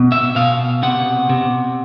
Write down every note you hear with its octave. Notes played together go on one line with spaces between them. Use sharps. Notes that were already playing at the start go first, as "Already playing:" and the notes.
Already playing: B2
E5
B2 F5
C3 F#5
C3